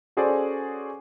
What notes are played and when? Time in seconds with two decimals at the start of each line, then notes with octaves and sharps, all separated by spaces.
0.17 C#4 F#4 G#4 A4 C5 D5